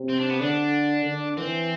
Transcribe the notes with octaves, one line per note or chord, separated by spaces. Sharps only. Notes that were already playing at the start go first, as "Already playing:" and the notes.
Already playing: C3
C4
D4
B3
D3 D4
D3
E3 C4